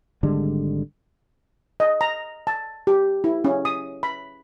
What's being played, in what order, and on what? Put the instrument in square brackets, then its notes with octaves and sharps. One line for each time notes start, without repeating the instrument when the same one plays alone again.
[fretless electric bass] G#1 D3 G3 G#3
[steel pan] D#5
A#5
A5
G4
E4
C#4
D#6
B5